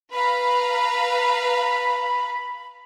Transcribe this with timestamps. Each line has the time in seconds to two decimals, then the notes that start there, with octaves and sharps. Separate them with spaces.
0.13 B4 F5 A#5 B5